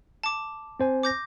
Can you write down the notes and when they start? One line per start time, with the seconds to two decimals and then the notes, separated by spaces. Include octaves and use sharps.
0.23 A5 D6
0.80 C4 C5 G#5
1.03 D6 G6 A#6